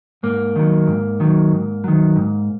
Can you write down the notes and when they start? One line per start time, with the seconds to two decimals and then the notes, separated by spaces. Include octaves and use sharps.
0.23 G#2 A#3
0.56 D#3 F#3
0.87 G#2
1.20 D#3 F#3
1.52 G#2
1.84 D#3 F#3
2.16 G#2